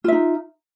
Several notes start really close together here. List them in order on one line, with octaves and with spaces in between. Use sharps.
F4 E5 D#4